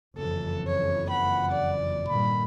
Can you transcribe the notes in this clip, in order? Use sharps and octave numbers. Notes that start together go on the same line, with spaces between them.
F#1 F2 E3 A4
C#5
F#5 B5
D5
G2 A#2 D#3 B5